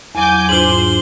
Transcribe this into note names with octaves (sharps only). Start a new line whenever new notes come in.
E2 F#3 G#5 D6 G6
G#2 D4 F4 C5 F#7 G7